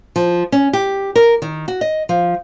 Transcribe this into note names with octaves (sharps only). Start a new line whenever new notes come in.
F3
C#4
G4
A#4
D#3
F#4
D#5
F3